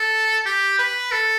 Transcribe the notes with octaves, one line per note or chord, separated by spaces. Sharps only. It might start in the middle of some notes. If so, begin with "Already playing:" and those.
Already playing: A4
G4
B4
A4